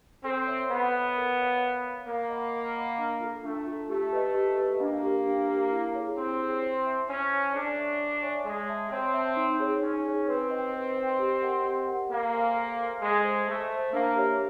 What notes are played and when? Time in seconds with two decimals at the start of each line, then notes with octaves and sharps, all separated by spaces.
0.24 C4 A4
0.46 C#5 E5
0.70 B3 A4
0.93 C#5 E5
1.16 A#4
1.38 C#5 F5
1.62 A#4
1.84 C#5 F5
2.06 A#3 A#4
2.29 D#5 F#5 B5 D6
2.52 A#4
2.75 D#5 F#5 B5 D6
2.98 D4
3.20 F4 A4
3.44 A3 D4
3.66 F4 A4
3.89 A3 G4
4.13 B4 D#5
4.34 G4
4.57 B4 D#5
4.80 A#3 D4
5.03 G4 A#4
5.26 D4
5.49 G4 A#4
5.72 E4
5.95 G#4 C#5
6.17 C4 E4
6.40 G#4 C#5
6.62 C5
6.86 E5 A5
7.08 C#4 C5
7.31 E5 A5
7.55 D4 A4
7.76 C#5 E5 G#5 C#6
8.00 A4
8.22 C#5 E5 G#5 C#6
8.45 G#3 C#5
8.69 E5 A5
8.91 C4 C#5
9.14 E5 A5
9.36 D#4
9.59 G#4 C#5
9.82 C#4 D#4
10.05 G#4 C#5
10.28 C4 B4
10.50 D#5 G5
10.73 B4
10.96 D#5 G5
11.19 G4
11.42 A#4 D#5 F#5
11.65 G4
11.88 A#4 D#5 F#5
12.10 A#3 A4
12.33 C5 E5 G#5 C6
12.55 A4
12.79 C5 E5 G#5 C6
13.02 G#3 A4
13.24 C5 E5
13.47 A3 A4
13.70 C5 E5
13.93 A#3 D4
14.16 G4 A#4 C#5 E5